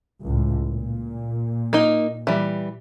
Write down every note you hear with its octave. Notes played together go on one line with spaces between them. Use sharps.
C#2 A2
A#2
A#3 D#4
E3 G3